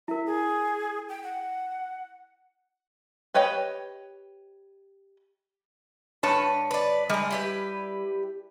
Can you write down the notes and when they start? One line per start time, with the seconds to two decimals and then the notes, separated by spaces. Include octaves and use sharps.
0.08 E4 A#4 E5
0.26 G#4
1.09 G5
1.24 F#5
3.34 G4 B4 C#5 D#5 G5
6.23 G2 B4 C#5 A5
6.71 B4 D5
7.10 G3 G#3 A#5
7.31 E4 G4 B4